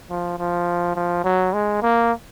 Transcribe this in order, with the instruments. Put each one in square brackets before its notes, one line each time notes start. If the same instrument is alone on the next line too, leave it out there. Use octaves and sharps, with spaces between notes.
[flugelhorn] F3
F3
F3
F#3
G#3
A#3